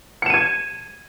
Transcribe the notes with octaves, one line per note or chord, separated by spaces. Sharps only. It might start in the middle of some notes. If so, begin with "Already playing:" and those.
G#6 C#7 D#7 E7